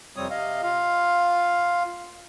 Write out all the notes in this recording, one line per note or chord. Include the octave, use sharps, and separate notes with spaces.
F2 C3 G3 C4 C#5 D#6
C3 D#5 F5
F4 F5